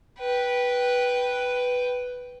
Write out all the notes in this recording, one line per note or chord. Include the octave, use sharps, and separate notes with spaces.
B4 G5